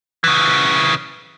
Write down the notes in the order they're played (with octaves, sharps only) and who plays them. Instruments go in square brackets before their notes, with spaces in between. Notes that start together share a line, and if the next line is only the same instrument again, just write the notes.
[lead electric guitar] C#3 E3